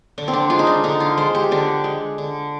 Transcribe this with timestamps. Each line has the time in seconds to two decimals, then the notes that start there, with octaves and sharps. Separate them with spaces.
0.18 D3 D4
0.28 C4
0.33 D4
0.50 G#3 F4
0.59 D#4
0.67 D4
0.84 D3 D#4
1.00 F4
1.17 G#3 C5
1.35 G4
1.51 D3 D4
1.84 G#3
2.18 D3